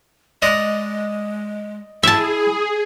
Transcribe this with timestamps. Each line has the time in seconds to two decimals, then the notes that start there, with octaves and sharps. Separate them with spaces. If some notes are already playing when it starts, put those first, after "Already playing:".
0.42 G#3 D5 D#5 A#5
2.03 E4 G#4 E5 A5